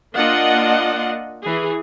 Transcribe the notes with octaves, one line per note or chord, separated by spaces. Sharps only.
A#3 D4 F4 D#5 F#5
E3 G#4